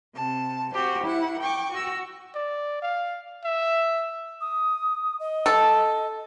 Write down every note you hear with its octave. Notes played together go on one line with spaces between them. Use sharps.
C3 A5
F#4 G4 C5
E4 F#5
G5 C#6 D6
F#4 E6
D5
F5
E5
D#6
D#5
A4